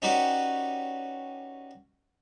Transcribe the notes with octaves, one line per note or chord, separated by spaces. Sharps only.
C#4 D#4 F#4 G4 B4 D5